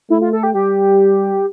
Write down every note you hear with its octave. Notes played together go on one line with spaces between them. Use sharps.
A3 E4
F4
A4
G4
G3 G4